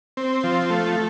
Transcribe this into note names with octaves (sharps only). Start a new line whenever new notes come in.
C4
F3
A3